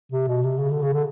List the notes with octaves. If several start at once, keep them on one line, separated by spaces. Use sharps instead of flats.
C3
B2
C3
C#3
D3
C#3
D3